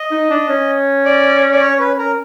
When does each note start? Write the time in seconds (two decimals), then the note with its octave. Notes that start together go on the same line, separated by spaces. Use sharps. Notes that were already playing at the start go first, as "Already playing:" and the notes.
Already playing: D#5
0.11 D#4
0.30 D4
0.49 C#4
1.05 D5
1.52 D5
1.61 C#5
1.79 B4
1.98 A#4